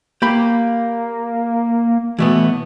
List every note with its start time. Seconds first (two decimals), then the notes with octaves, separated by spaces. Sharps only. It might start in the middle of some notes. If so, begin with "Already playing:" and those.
0.22 A#3 G4 B5
2.19 B2 E3 A3 B3